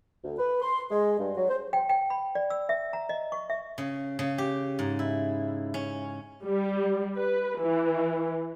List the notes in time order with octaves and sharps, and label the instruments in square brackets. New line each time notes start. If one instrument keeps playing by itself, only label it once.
[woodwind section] D2
B4
C6
G#3
G2
F#3
C5
[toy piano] G5
G5
B5
D5
E6
E5
A#5
D#5
C#6
E5
[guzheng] C#3
C#3
G4
G#2
E4
C#4
[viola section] G3
B4
E3